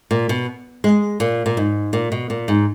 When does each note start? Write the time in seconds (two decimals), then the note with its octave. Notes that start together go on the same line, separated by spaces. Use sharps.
0.11 A#2
0.29 B2
0.84 G#3
1.20 A#2
1.46 A#2
1.57 G#2
1.93 A#2
2.12 B2
2.30 A#2
2.48 G#2